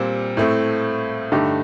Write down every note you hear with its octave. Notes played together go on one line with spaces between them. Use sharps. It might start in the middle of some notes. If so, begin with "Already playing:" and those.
Already playing: A#2 G3 C4
A2 A3 C4
G2 D3 A3 D#4 G4